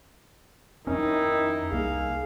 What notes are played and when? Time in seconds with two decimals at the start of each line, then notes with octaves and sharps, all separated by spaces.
0.87 F2 D#3 C#4 D#4 E4
1.72 C2 A#3 G#4 F5